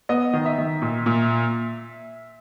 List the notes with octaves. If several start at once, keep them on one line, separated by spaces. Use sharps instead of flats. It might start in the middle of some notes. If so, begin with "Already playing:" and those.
B3 D#5
D#3
E5
D#3
A#2
A#2